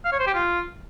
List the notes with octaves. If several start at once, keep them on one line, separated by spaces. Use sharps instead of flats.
F5
C#5
C5
G4
F4